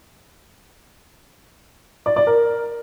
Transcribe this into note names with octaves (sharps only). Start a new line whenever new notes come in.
D5
D5
A#4